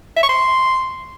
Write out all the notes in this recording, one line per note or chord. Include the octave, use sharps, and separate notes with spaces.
E5
C#6
C6